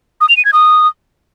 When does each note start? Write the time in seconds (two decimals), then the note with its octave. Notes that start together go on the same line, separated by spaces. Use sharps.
0.21 D#6
0.29 F7
0.37 D#7
0.45 G#6
0.53 D#6